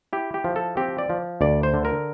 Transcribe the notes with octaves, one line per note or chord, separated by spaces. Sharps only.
E4 G4
G4
F3
A4
C4 G4
D5
F3
D2 D5
C5
D3
A#4